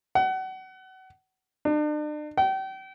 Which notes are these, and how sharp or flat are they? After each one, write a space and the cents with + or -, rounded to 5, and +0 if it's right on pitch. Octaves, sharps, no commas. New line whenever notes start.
F#5 +30
D4 +40
G5 -35